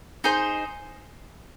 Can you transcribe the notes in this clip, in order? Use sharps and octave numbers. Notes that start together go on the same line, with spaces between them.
D#4 G#4 C5